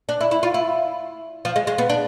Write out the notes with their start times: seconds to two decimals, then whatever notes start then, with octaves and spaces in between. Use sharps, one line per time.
0.09 D4
0.21 E4
0.31 E4
0.43 F4
0.54 E4
1.45 F3
1.56 G#3
1.67 G#3
1.78 B3
1.90 D4